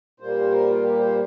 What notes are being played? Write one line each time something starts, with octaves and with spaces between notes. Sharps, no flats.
A#2 G3 A#3 C5
A#4
F4
G4
C5